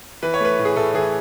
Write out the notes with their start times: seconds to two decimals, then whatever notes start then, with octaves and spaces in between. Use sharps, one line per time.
0.23 E3 B4
0.34 C#5
0.41 A3 B4
0.59 A2
0.65 G#4
0.76 A2 A4
0.94 E3 G#4